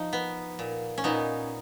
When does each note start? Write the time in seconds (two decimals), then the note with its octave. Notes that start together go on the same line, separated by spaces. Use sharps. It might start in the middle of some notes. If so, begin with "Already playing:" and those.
Already playing: F3 D#4
0.13 B3
0.59 A#2
0.98 C#4
1.04 A#2 B3 D#4